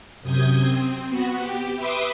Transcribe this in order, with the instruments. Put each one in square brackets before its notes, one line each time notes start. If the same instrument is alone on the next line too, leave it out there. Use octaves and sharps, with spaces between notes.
[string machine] F#2 C3 D#6 G6 G#6
C4
B3 F#4
G4
B4 E5 B5 C6 D6 D#6